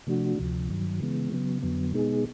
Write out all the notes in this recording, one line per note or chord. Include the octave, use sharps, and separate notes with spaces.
C3 F3 A3 D4 F#4
D2 C3 F3
G2 D#3 F#3
C#3 E3 G#3 B3
C#3 F#3 B3
F2 D3 F#3 B3
B2 G#3 B3 D#4 G#4